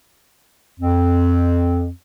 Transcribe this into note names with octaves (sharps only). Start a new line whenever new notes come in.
F2 C4